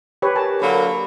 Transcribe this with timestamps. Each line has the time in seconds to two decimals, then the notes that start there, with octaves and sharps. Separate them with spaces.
0.22 G4 B4 C#5
0.36 G4 A#4 G#5 A5
0.62 D3 F#3 A#3 A4 B5